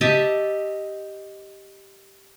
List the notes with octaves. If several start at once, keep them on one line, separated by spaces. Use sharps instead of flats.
G4 D#5 E5 A5